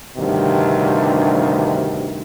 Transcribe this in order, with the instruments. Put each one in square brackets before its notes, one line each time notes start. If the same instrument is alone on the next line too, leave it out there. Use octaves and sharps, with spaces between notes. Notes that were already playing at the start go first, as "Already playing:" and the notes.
[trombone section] D2 G2 C3 D#3